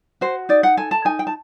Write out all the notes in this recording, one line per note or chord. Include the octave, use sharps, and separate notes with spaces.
F#4 C5
D#4 D5
F#5
A4 G#5
A5
D#4 G#5
G5
A5